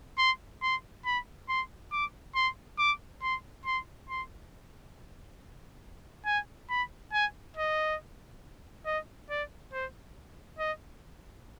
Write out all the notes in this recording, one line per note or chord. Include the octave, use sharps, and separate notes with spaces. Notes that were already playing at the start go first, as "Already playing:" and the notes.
C6
C6
B5
C6
D6
C6
D6
C6
C6
C6
G#5
B5
G#5
D#5
D#5
D5
C5
D#5